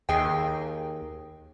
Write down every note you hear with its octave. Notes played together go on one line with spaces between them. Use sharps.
D#2 G#4 D#5 G5